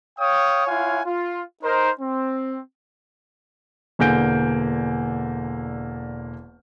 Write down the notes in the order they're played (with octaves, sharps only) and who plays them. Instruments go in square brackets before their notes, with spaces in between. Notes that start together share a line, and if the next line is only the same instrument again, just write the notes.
[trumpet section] C#5 F5 G5 D#6
E4 F4 C#5 F5 F#5 G#5
F4
D#4 A#4 C5
C4
[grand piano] E1 D3 A#3 G#5 G6 D7